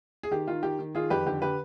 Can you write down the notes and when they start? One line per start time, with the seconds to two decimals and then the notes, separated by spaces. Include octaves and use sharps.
0.23 G#4
0.31 D#3 G4
0.47 D#3 F4
0.63 D#3 G4
0.79 D#3
0.95 D#3 F4 G#4
1.10 F2 G4 B4
1.26 D3 G4
1.42 D3 G4 B4